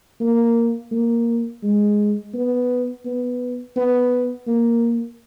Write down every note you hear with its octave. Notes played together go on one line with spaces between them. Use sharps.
A#3
A#3
G#3
B3
B3
B3
A#3